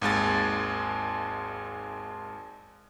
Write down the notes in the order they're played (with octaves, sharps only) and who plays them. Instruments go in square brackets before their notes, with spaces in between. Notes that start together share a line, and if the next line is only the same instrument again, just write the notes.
[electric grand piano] G#1 D#2 G#3 A6